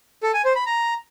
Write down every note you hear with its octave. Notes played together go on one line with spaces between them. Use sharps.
A4
G#5
C5
B5
A#5